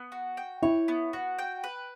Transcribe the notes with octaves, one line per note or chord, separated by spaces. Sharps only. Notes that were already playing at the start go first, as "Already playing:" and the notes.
Already playing: B3
F#4
G5
E4 C#5
B3
F#4
G5
B4